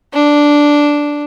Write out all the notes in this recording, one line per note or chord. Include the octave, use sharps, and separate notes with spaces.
D4